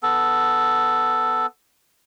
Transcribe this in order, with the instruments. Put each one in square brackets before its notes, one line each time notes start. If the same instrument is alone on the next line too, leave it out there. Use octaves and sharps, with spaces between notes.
[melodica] B3 A4